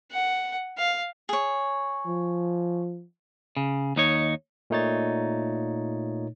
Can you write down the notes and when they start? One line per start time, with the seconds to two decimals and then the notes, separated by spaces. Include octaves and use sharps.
0.12 F#5
0.78 F5
1.29 G#4 C#5
2.06 F3
3.57 C#3
3.96 D#2 D#4 C#5
4.70 A#2 A3 D#4 C#5 A6